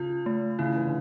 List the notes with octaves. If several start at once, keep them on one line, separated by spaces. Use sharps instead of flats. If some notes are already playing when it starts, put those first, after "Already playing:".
Already playing: C#3 F4
A3
C#3 E4
E3
D3